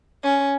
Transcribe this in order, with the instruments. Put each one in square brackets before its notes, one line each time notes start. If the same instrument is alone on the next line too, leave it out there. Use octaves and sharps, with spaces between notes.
[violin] C#4